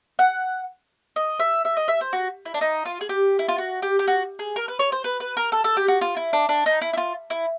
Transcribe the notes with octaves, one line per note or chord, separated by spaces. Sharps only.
F#5
D#5
E5
E5
D#5
E5
C5
F#4
E4
D4
D#4
F4
G#4
G4
E4
F4
F#4
G4
G4
F#4
G#4
A#4
B4
C#5
C5
B4
B4
A#4
A4
A4
G4
F#4
F4
E4
D4
D4
D#4
E4
E4
F4
E4